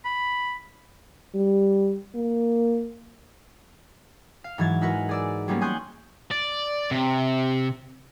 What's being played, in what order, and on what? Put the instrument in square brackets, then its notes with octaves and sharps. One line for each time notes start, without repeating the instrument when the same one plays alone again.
[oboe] B5
[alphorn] G3
A#3
[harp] F5
G#2 E3 F#3 G#6 A6
G#3 E4 F#4 A#4 B4
G#4 D5 E6
F#3 G3 A#3 B3 C#4
G#5 C6 C#6 D#6 F#6 G6
[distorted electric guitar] D5
C3